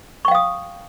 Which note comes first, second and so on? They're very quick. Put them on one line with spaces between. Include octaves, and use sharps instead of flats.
C#6 G5 F5 D#6